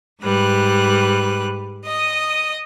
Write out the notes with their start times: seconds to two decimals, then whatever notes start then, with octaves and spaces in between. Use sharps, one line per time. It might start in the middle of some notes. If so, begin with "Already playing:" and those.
0.21 G#2 G3 B4 F#6
1.84 D#5 D#6